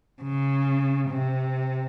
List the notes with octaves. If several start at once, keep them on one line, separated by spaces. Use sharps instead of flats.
C#3
C3